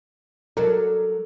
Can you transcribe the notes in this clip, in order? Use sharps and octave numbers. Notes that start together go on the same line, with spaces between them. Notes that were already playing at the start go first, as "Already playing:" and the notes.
F#3 A4 A#4 D5